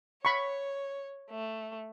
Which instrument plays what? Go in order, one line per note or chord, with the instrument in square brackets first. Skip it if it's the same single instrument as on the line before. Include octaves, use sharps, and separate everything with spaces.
[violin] C#5 [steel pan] B5 C#6
[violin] A3